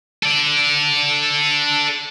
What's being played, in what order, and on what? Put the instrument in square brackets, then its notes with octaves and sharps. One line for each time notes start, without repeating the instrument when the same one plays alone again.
[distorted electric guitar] A4 D5